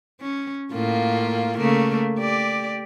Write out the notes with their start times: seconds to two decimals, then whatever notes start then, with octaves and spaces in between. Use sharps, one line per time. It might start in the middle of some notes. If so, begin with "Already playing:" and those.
0.20 C#4
0.72 A2 A#3 F4
1.57 C#3 A3 A#3
2.19 G4 D5